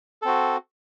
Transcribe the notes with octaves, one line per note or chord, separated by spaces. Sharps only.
C4 F#4 A4